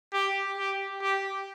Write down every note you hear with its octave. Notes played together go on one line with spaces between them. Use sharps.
G4
G4
G4